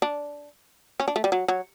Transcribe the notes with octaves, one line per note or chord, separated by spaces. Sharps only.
D4
C#4
D4
A3
G3
F#3
F#3